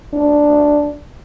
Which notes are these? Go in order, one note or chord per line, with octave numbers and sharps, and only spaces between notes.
D4